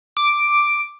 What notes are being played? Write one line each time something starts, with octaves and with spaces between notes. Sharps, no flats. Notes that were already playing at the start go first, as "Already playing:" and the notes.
D6